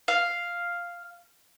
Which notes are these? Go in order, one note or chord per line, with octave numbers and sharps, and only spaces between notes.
F5